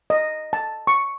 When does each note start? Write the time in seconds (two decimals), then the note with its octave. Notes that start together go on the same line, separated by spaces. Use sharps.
0.10 D#5
0.53 A5
0.87 C#6